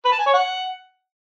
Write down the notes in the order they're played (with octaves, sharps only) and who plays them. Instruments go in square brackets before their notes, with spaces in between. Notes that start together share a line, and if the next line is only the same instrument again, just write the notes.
[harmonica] B4
A5
G#5
C#5
F#5